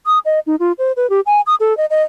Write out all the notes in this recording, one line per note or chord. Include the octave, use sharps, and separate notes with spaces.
D#6
D#5
D#4
F4
C5
B4
G4
G#5
D#6
A4
D#5
D#5